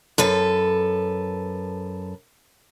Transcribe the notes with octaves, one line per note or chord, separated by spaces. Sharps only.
F#2 A4 B4